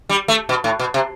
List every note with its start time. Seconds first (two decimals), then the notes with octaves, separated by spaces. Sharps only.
0.09 G3
0.28 A3
0.49 B2
0.64 A2
0.79 B2
0.94 C3